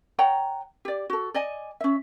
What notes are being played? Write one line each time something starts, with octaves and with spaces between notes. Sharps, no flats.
C#5 F#5 G5 A#5
G4 D5
F#4 A4
D5 D#5 G#5
C#4 E5